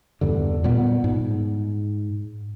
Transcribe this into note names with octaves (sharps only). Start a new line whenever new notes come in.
E2 G2 D3
A#2 G3 B3
G#2